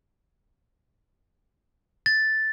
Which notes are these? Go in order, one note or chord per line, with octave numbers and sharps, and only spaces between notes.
A6